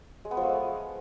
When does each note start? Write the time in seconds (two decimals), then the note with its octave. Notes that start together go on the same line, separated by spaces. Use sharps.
0.25 G#3
0.31 B3
0.37 F3
0.43 A3
0.49 G#3